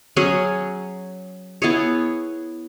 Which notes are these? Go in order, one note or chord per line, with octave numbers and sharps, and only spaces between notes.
F#3 C#4 G#4 C#5
B3 E4 G#4 C#5